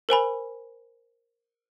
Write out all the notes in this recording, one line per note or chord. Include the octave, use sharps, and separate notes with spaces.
A#4 C5 G#5 B5